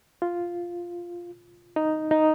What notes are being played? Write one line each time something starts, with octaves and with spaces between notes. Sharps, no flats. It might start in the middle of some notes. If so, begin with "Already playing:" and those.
F4
D#4
D#4